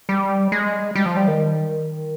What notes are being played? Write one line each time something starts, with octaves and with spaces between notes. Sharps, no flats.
G3
G#3
G3
F3
G3
D#3